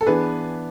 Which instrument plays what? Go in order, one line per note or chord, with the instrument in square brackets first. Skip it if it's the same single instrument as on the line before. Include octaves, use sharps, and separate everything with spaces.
[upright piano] A4
[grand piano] E3 B3 D4 [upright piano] G#4 B4